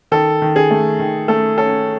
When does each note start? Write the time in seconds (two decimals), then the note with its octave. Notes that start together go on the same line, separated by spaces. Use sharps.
0.11 D#3 A4
0.42 D#3
0.56 G#4
0.70 A3
0.99 D#3
1.28 A3 A4
1.58 C#4 A4